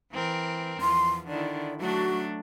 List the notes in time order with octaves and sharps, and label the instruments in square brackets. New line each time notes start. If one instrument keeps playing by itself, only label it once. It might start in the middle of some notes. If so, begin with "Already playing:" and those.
[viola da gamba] E3 C4 A#4
[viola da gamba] E2 F3 [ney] C6
[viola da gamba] D3 D#3 E4 [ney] D5
[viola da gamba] F#3 A3 D4 [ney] F#4